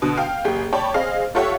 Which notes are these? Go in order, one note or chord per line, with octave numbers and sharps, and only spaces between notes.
B2 D3
F5 G5
F#1 G4 G#4
C#5 D5 G5 A5 B5
C4 G#4 D#5 F5
F4 G4 A4 C#5 E5 F#5